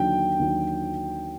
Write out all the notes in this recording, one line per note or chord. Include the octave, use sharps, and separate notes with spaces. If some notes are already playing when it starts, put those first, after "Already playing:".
Already playing: D#2 D3 F#3 G5
D#2 D3 F#3